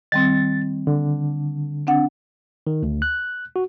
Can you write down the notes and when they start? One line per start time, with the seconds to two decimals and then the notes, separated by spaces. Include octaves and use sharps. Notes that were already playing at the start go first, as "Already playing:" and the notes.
0.12 D#3 G3 C4 A6
0.87 D3
1.87 C4 D4 F#5
2.67 D#3
2.83 D2
3.02 F#6
3.56 F#4